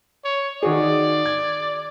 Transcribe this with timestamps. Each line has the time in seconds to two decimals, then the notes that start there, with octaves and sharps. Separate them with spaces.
0.24 C#5
0.63 D#3 F#4 G#4 D5
1.26 G#6